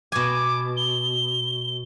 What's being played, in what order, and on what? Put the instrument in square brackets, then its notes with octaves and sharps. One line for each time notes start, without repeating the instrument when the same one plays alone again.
[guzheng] B2 G#5 [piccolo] D6
[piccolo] G7